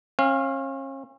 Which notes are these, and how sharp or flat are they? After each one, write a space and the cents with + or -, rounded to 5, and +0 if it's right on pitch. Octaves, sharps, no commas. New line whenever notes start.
C#4 -40 F5 +0